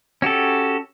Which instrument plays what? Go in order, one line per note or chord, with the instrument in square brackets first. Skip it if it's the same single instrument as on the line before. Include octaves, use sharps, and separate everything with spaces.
[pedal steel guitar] C#4 F#4 G4 A4